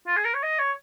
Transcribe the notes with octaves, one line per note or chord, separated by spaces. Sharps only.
F4
G#4
A#4
C#5
D#5
C#5